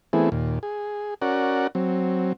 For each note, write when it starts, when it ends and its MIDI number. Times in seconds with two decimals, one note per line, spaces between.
0.13 0.29 52
0.13 0.29 57
0.13 0.29 59
0.13 0.29 60
0.13 0.29 64
0.13 0.29 68
0.32 0.59 39
0.32 0.59 46
0.63 1.14 68
1.22 1.67 61
1.22 1.67 66
1.22 1.67 70
1.22 1.67 74
1.22 1.67 78
1.75 2.33 54
1.75 2.33 60